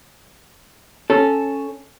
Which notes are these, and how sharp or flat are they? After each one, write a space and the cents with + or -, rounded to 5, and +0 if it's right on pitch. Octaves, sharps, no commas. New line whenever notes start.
C#4 -5 A4 -5